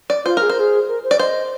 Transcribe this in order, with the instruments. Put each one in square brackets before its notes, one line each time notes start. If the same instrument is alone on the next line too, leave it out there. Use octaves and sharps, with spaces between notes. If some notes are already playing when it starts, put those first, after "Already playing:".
[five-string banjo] D5
[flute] F4 [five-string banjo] C5
[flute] G#4 [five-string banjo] A#4
[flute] A#4 [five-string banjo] C5
[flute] G#4
A#4
C5
[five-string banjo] D5
[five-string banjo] C5 [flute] D#5